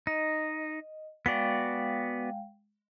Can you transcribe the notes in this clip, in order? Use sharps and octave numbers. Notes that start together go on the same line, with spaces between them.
D#4 D#5
G#3 B3 F#4 D5 F5 G5